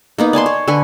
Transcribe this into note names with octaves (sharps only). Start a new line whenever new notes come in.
A#3 B3 D#4
D5 G#5 A5 C6
C#5
D3 B4 G#5 C#6